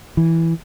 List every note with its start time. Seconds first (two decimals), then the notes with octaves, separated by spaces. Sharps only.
0.17 E3